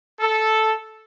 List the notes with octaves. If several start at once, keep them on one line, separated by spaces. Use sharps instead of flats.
A4